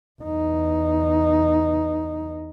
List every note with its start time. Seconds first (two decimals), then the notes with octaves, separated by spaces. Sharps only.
0.22 E2 D#4